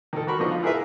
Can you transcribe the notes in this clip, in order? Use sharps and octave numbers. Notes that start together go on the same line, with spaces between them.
D#3 A4
F#4 A#4 B5 C#6
D3 F3 B3 D#4
F4
E4 G#4 A#4 B4 E5